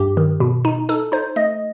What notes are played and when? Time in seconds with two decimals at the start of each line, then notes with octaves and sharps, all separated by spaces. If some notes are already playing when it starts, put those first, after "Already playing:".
Already playing: G2 G4
0.17 D#3
0.40 B2
0.65 D#4
0.89 D#4 A4
1.12 D#4 C5
1.36 A3 D#5